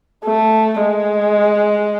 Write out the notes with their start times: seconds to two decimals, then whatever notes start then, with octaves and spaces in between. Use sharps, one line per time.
0.24 A3
0.80 G#3